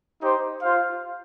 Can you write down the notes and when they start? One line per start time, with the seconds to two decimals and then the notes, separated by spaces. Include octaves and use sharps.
0.20 D#4 G4 C5
0.62 F4 C5 F5